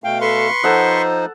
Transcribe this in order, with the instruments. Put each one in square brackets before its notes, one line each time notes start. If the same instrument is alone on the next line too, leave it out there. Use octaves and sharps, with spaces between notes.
[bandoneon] B2 A3 F5 [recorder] G5
[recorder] A4 [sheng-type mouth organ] B4 C6 C#6
[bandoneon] F3 D#4 [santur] A4 F#5 [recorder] C5